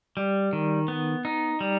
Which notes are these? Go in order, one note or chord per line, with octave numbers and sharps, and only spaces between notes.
G3
D#3
B3
D#4
G3